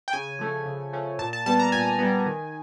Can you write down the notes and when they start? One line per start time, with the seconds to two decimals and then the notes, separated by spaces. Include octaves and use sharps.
0.08 G5
0.13 C#3 G#5
0.39 F3 A3 C#4
0.66 C#3
0.93 F3 A3 C#4
1.19 A#2 A5
1.33 A5
1.46 G3 B3 A5
1.60 A#5
1.72 A#2 G#5
1.99 G3 B3
2.26 D#3